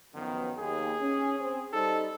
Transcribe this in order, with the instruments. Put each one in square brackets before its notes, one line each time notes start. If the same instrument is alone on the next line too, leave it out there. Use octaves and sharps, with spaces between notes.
[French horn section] F#2 F3 B3 [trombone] D#3
[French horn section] D#2 [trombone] G#4
[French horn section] C#4
C4
[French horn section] G3 D#4 C5 [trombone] A4